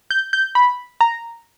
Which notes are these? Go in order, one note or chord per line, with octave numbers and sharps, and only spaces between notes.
G6
G6
B5
A#5